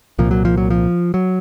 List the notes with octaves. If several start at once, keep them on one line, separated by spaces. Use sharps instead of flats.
C2 A#2 F3
F#3
F3
F#3
F3
F#3